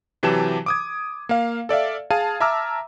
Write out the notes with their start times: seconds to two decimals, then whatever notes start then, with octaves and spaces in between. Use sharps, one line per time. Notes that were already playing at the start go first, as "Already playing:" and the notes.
0.23 C3 E3 F#3 G4 A5 E7
0.66 D6 D#6 G#6
1.29 A#3 F5
1.69 A4 D5 E5 F5
2.10 G#4 F5 A5 G#6 D#7
2.40 E5 A5 A#5 D6 E6 F6